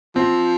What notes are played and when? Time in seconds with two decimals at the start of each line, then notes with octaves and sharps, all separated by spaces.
0.16 F3 C4